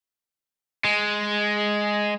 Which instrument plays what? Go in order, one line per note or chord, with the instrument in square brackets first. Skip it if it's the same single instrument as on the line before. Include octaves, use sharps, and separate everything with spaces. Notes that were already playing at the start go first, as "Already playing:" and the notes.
[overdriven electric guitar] G#3